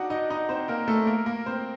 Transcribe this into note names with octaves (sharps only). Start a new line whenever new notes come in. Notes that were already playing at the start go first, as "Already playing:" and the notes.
Already playing: D4 D#4 F#4 D5 D#5 F#5
D#4 D#5
D#4 D#5
C4 C5
A#3 A#4
A3 A4
A#3 A#4
A#3 A#4
C4 C5